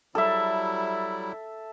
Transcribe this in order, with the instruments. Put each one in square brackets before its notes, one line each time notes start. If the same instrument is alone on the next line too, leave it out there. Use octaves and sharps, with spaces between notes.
[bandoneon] F#3 G3 E4 [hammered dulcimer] A4 E5